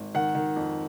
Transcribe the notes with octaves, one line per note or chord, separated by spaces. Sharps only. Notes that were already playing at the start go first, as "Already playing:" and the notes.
Already playing: G#1
D#3 F#5
D#3
F2